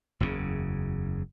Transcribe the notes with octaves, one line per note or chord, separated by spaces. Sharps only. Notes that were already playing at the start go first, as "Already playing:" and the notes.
F#1 E2 A2 C#3